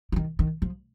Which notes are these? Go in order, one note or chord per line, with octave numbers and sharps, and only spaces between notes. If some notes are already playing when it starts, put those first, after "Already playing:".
C#3
D#3
D#3
F3